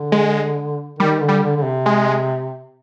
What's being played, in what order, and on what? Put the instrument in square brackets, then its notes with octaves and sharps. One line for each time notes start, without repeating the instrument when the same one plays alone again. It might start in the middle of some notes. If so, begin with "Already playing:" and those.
Already playing: [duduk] D3
[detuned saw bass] G#3
[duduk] D#3 [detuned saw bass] G3
[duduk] D3
[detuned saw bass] G3
[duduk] D3
D3
C3
[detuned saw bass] G#3